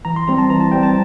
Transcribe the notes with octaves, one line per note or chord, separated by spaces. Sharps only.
E3 A#5
C6
G3 C4 A#5
A5
E3 A#5
A5
G3 C4 G5
A5